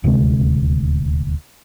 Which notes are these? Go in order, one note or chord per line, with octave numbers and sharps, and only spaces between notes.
D#1 D2 C3 G#3